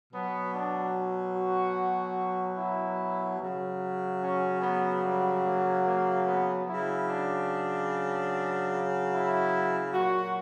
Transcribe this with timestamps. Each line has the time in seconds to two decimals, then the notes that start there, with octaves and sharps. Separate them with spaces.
0.11 B2 F#3 B3
0.52 D4
1.34 F#4
2.57 E4
3.39 C#3 F#3
4.20 C#4
4.61 B3
5.02 G3
5.43 A#3
5.85 A#3
6.25 B3
6.66 C#3 F#3 E4
7.08 D4
9.12 E4
9.94 A#2 F#3 F#4